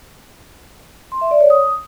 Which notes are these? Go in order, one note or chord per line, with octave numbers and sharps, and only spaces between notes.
C6
E5
D5
C#5
D#6